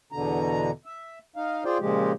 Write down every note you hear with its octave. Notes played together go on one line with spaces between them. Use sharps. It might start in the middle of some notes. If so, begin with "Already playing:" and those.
E2 B2 D3 A#5
E5
D#4 F5
F4 G#4 C5 D5 G5
A#2 C#3 F3 G#3 G4